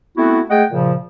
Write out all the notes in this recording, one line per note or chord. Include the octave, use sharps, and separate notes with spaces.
A3 B3 C4 E4 F#4
G#3 A3 G#4 D#5 F#5 G5
A#2 C#3 F3